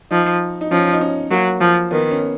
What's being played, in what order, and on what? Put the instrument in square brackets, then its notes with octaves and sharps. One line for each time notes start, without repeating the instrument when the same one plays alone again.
[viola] F3 [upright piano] D#4
[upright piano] D#4
[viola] F3 [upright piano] C#4
[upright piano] D#4
C#4
[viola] F#3 [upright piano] A#3
[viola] F3
[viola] D#3 [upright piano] B3
[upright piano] C#4